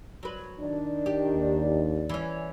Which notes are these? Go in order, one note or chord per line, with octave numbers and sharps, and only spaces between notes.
F#3 B4
D#3 D4 D5
G4
D#2
E3 C#4